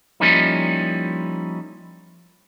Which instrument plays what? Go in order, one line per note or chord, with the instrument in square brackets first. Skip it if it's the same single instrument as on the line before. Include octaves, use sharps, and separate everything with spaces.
[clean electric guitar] F3 G3 A#3 C#4 D#4 E4